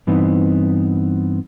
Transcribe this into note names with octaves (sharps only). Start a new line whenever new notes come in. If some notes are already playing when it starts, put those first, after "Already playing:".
G2 E3 B3 C4 D#4